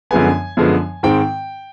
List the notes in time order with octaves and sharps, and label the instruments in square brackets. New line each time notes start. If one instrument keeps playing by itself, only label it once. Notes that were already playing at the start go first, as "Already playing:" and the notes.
[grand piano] F#2 D3 F3 G#3 B3 G#5
F#2 D3 F3 G#3 B3
G#2 D#3 G#3 C4 G5